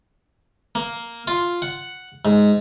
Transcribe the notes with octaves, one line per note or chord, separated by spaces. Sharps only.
A#3
F4
F#5
G#2